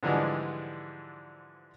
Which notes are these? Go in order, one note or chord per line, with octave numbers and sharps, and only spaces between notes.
G#2 D3 E3 F3 G3 G#3